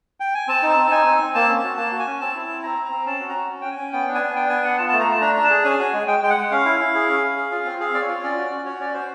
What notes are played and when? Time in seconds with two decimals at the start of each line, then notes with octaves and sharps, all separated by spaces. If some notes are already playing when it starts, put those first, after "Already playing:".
0.20 G5
0.34 G#5
0.48 C4 A5
0.62 D#4
0.70 A5
0.77 C4
0.86 A5
0.91 D#4 G#5
1.06 C4
1.20 C4
1.35 A#3 A5
1.49 C#4
1.64 F#4
1.77 A#3 A5
1.92 F#4
1.99 G#5
2.06 C#4
2.20 C4 A5
2.35 E4
2.48 C4
2.63 C4 A#5
2.78 C4
2.85 A#5
2.92 C4
3.06 C#4 A5
3.20 F#4
3.29 A#5
3.36 F#4
3.49 C#4
3.61 C#4 G5
3.71 G#5
3.79 C#4
3.93 B3 G5
4.07 D4
4.15 G#5
4.22 B3
4.35 D4 G5
4.49 B3 G#5
4.64 B3 F#5
4.78 F4 A5
4.89 A3 A5
5.00 A#5
5.07 A3 A5
5.21 D4 A#5
5.33 D4 A#5
5.44 A5
5.51 G#4
5.64 C#4 G#5
5.79 F#4
5.93 G#3
6.07 G#3 G5
6.22 G#3 G5
6.30 F#5
6.37 G#3
6.51 C#4 F5
6.65 E4
6.80 E4
6.94 G#4
7.09 C#4
7.22 C#4
7.37 G#4
7.51 F4
7.65 C4
7.80 G#4 F5
7.94 C4 D5
8.01 C#5
8.08 F4
8.23 C#4 D5
8.37 F#4
8.51 C#4
8.65 F#4 C#5
8.80 C#4 D5
8.94 F#4 C5